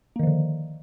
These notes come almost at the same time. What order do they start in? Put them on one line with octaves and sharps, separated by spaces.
A#3 D#3 F3 D3